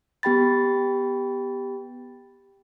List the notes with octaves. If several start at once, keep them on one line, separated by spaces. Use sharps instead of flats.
B3 G4 G5 B5 A6